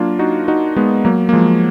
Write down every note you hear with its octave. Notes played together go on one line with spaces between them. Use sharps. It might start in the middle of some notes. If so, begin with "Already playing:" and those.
Already playing: F#3 A#3 D4 F4
D#4 F#4
D#4 F#4
G#3 B3
F#3 A#3
A#3
F3 G#3